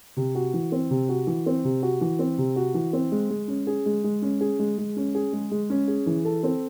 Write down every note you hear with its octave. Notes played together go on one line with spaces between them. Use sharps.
C3
F#4
E3
C4
C3
F#4
E3
C4
C3
F#4
E3
C4
C3
F#4
E3
C4
G#3
G#3
C#4
G#4
G#3
G#3
C#4
G#4
G#3
G#3
C#4
G#4
G#3
G#3
C#4
G#4
E3
A4
C4